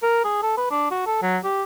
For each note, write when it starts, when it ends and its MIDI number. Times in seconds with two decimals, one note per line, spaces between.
0.03 0.23 70
0.25 0.42 68
0.43 0.53 69
0.57 0.66 71
0.71 0.87 62
0.91 1.05 66
1.06 1.17 69
1.22 1.38 54
1.44 1.64 67